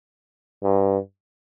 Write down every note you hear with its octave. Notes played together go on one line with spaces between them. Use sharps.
G2